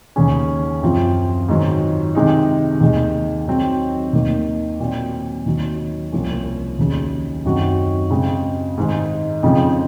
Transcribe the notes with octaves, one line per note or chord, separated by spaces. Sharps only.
D#2 C#3 G#3 C#4 G#4
F#2 F3 C4 F4
G#2 D#3 F#3
C3 D#3 G#3 D#4
D#2 D#3 G#3
D#3 F#3 C4
D#2 D#3 A#3
A#2 F#3 C4
D#2 D#3 F#3
C2 C3 F3 A#3 C#4
D#2 C#3 F#3
F#2 D#3 F#3 C4 F#4
C#3 G#3 C4
G#2 D#3 G#3
F2 C#3 F3 C4 D#4